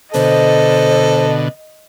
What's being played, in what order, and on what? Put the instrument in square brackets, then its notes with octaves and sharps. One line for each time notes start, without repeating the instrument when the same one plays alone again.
[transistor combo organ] B2 D3 [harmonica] A4 [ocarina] C5 [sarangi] D#5